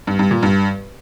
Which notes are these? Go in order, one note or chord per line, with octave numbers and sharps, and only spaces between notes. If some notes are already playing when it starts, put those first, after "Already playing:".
G2
G2
A#2
G2